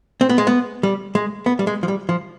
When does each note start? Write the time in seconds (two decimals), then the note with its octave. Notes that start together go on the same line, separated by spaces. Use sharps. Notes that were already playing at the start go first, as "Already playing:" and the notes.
0.21 C4
0.29 B3
0.38 G#3
0.47 B3
0.83 G3
1.15 G#3
1.46 B3
1.59 G3
1.67 G#3
1.83 F3
1.88 G3
2.09 F3